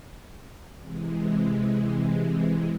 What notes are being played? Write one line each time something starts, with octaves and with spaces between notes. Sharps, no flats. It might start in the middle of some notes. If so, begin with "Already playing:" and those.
C3 E3 G#3